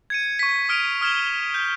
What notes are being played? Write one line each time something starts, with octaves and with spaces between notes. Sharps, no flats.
G#6 C#7 D#7
C#6 B6
D#6 F6 D7 D#7 F7
D#6 F6 G#6 E7 G7
G6